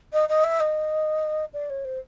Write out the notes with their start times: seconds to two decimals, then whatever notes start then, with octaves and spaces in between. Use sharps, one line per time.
0.13 D#5
0.29 D#5
0.44 E5
0.60 D#5
1.54 D5
1.70 C#5
1.85 C5